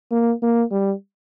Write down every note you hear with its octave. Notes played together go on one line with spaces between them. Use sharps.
A#3
A#3
G3